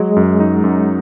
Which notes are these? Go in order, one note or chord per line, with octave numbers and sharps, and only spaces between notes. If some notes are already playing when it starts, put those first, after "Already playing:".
Already playing: F#3 G#3
F#2
D#4
F#2